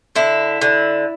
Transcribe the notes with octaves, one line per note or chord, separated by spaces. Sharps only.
D3 E4
D3